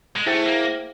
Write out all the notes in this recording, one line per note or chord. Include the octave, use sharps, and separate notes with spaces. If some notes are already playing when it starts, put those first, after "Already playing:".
G#3
A3 E4 G#4 C5 E5 G5
A#3